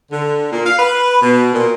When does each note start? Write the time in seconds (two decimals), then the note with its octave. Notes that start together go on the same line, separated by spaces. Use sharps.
0.12 D3
0.52 A#2
0.66 F5
0.79 B4
1.22 B2
1.53 A#2